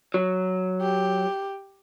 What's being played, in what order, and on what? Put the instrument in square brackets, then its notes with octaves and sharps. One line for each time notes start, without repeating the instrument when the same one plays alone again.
[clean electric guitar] F#3
[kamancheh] G4